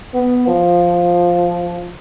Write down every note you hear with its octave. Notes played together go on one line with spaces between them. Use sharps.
B3
F3